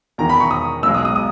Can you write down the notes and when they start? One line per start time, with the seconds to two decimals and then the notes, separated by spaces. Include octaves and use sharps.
0.18 E2 D#3 A#3 A#5
0.29 B5
0.40 C#6
0.51 D#6
0.83 B1 B2 G#3 E6
0.94 D#6
1.05 D#6
1.16 D#6